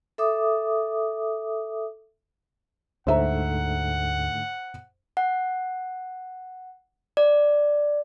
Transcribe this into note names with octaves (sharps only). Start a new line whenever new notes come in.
A4 E5 D6 D#6
D2 G#2 D3 A3 C5 E5 F#5 A#5
F#5
D5